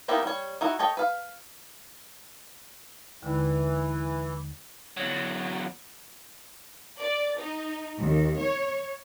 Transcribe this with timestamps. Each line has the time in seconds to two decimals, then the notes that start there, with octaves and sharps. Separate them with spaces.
0.08 A#3 B3 D#4 E4 G4
0.23 G3 C#5
0.61 D#4 E4 F#4
0.79 A4 C#5 D#5 G5
0.97 B4 F5
3.22 D#2 D3 E3 G#3
4.97 E2 F#3
6.99 D5
7.38 D#4
8.02 D#2
8.40 C#5